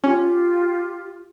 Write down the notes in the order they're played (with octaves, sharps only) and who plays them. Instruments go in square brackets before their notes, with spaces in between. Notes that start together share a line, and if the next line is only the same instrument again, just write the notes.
[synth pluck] C#4 [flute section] F4 G4